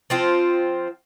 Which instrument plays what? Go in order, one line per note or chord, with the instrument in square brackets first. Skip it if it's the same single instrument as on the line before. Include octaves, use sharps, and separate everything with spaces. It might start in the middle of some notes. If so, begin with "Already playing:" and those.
[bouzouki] F3 C4 F4